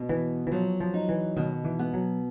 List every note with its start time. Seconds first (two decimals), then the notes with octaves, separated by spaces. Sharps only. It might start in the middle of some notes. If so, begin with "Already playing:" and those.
Already playing: B2
0.09 E3 B3
0.47 E3
0.52 F3 F#3
0.81 F3
0.94 D#4
1.09 E3
1.37 B2 D#3
1.65 E3
1.79 B3
1.94 F#3